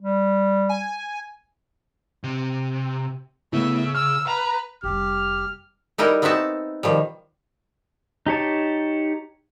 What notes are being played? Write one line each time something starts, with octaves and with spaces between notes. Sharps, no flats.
G3
G#5
C3
C#3 A3 B3 E4 E5
E6 F6
B4 A#5
F1 G3 G4 F6
G3 D#4 E4 A#4 D#5
B3 C4 D#4 F#4 E5 A5
B2 D#3 F3 G3
D#4 G4 C#5 A5